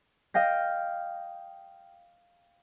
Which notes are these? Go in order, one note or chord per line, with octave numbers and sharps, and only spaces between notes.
D#5 F5 G5 A#6